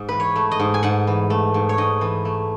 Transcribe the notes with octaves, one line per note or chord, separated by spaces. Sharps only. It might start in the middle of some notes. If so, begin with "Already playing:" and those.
Already playing: G#2
E3 B4
C#5
A3
D#5
G#2
G#5
G#2 F#5
E3
A3
G#2
C#5
G#2 D#5
E3
A3